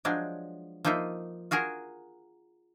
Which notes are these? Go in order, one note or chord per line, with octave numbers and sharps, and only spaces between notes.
F3 F#3 G#3 D4
F3 A#3 D#4 F4 E5
F4 F#4 G#4 A#4